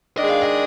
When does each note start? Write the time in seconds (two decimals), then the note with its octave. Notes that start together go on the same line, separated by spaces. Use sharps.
0.18 D#3 G#3 D4 G#4 D#5
0.30 F5
0.43 D#5